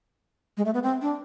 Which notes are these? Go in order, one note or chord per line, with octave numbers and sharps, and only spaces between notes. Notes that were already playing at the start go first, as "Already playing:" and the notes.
G#3
A3
B3
C4
D4